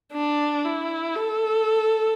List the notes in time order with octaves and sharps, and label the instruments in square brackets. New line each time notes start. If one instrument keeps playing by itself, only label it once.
[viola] D4
E4
A4